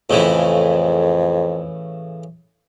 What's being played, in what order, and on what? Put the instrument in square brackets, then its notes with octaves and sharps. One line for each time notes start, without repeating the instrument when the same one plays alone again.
[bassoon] F2 [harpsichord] A2 C#3 E3